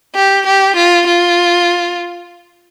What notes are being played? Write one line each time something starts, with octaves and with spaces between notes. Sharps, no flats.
G4
G4
F4
F4